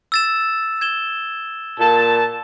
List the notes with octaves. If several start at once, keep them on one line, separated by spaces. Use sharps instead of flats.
E6 A6 E7
G#6 E7 G7
A#2 A5